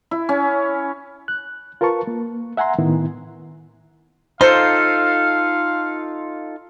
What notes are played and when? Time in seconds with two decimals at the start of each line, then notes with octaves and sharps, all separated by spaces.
0.11 E4
0.29 C#4
1.28 F#6
1.81 F4 A#4 B4 A5 C#6
2.07 A#3
2.57 E5 F#5 G#5 A#5 C6
2.78 A2 D#3 B3 E4
4.41 D#4 F4 A4 C5 F5